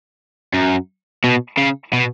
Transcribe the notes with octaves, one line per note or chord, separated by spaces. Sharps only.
F#2
B2
C#3
B2